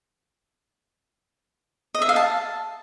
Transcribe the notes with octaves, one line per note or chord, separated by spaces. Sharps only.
D#5
E5
F5
A5